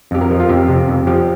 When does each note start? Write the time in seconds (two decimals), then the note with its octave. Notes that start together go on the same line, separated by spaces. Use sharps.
0.11 F2 G4
0.21 A#4
0.31 F3
0.40 F4
0.49 F2 G4
0.68 C3
0.88 F2
1.07 F3 G4